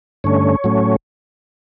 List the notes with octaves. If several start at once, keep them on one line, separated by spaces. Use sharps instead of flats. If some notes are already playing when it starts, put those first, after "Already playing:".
G2 D3 A3 C#4 C#5
A2 F#3 A3 C#4